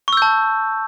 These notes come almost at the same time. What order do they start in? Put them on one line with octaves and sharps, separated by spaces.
C#6 E6 G6 A5